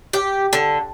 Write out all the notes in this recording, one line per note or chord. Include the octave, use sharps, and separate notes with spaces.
G4
D3